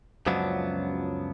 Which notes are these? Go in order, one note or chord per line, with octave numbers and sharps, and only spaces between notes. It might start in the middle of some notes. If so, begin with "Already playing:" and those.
C#2 F#2 F3 F#3 B3 D4